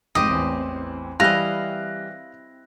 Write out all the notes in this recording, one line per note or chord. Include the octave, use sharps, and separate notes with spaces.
F1 G#2 C4 G4 D#5 D#6
A1 E2
E3 G3 E4 D#5 F5 F#6 A#6